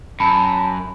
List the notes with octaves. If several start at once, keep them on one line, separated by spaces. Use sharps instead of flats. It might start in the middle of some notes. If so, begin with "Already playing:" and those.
F#2 A5 B5